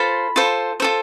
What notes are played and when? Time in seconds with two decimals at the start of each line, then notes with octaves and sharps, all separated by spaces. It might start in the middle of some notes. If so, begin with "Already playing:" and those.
Already playing: F4 A4 C5 B5
0.36 F4 A4 C5
0.80 F4 A4 C5